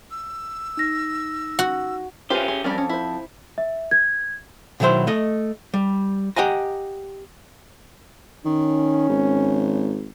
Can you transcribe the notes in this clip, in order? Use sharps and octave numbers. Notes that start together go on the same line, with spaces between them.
E6
D#4 A#6
F#4
C#4 F4 G4 B4 C5
G#4
F2 G3 C#4 A#4
C#4
E4 C5
E5
G#6
B2 D#3 F#3 E4 C5
A3 D#5
G3
G4 D#5 F#5 G#5 A#5
D#3 C#4
G#1